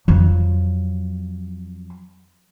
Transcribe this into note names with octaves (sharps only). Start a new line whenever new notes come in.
F2 F#3